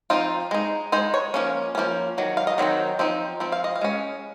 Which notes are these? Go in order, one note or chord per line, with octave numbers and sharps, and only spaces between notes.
F3 C4 D#4 F4
G#3 D#4
G#3 D#4 C5
C#5
F3 A#3 C#4
F3 A#3 C#4
D#3 F#3
F5
D#5
D#3 F#3 C4 D#4
F3 C4 D#4
F3 C4
F5
D#5
F5
G#3 C#4